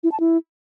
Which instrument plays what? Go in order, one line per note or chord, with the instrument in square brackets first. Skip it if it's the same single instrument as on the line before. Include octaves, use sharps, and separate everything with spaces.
[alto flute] E4
A5
E4